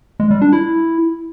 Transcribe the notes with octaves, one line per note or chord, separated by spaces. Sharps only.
G#3
G3
D4
E4